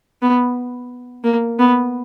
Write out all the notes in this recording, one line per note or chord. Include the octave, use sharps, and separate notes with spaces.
B3
A#3
B3